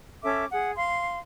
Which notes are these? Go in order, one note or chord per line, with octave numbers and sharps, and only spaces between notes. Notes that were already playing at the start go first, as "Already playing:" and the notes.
C#4 A4 E5 D6
G#4 F#5
F5 C6